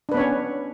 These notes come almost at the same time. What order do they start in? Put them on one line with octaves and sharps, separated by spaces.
D4 B4 B3 C#5 C#4